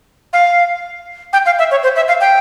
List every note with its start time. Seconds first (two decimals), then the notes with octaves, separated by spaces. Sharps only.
0.33 F5
1.33 G5
1.46 F5
1.59 E5
1.71 C#5
1.83 C5
1.96 E5
2.08 F5
2.21 G5